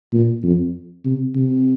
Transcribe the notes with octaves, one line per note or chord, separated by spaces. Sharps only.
A#2
F2
C3
C3